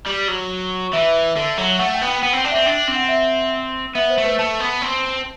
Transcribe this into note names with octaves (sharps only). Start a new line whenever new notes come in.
G3
F#3
E3 E5
D3
F#3
A3 F#5
G5
B3
G5
B3 G5
C4 G5
D4
E5
C4
D4 G5
C4
F#5
E5
B3 E5
C5
A3
B4
A3 A5
B3
C4